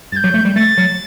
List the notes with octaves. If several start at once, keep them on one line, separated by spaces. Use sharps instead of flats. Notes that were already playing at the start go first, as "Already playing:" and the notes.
G2 A6
G6
F#3
A3
G3
A3 A6
F#3